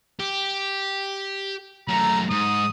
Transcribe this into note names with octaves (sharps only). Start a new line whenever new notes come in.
G4
F#2 A3 A#5
G#2 D#6